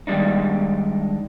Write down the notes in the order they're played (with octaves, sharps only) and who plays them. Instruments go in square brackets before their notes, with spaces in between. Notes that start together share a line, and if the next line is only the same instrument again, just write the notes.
[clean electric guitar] D#3 G3 G#3 D4 D#4